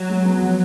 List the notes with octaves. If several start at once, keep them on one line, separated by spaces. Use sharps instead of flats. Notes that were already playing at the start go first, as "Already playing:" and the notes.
Already playing: F#3
G#3
B3
F3